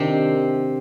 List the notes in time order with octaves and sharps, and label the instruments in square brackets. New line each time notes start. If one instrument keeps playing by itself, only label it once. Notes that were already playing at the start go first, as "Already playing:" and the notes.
Already playing: [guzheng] C3 D#3 C4 D4